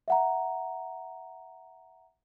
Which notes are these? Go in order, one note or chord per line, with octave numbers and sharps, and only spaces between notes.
E5 F#5 A#5